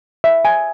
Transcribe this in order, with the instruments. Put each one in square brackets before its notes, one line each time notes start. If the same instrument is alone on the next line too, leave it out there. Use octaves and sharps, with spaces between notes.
[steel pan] E5
G#5